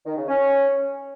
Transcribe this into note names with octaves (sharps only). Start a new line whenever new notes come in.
D#3
C#3
C#4